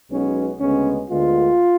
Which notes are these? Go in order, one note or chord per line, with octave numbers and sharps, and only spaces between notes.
B1 B2 G#3 B3 C#4
D2 C#3 G#3 B3 C#4
D2 D3 G#3 B3 F4